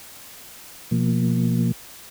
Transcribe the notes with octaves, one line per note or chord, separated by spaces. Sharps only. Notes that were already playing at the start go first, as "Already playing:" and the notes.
B2 F3 A#3